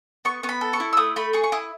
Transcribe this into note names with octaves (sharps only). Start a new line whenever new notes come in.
B3 C#6
B3 C#6
B5
A4
C#6
E4
E6
A3 D#6
A3 B5
G#4 C#6
C#6
E4 D#6